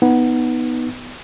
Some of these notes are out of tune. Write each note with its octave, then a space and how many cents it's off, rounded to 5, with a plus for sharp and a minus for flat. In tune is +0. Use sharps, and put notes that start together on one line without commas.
B3 +0 D#4 +0